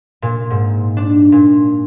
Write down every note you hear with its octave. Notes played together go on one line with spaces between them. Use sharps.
A#2
G#2
D4
A#2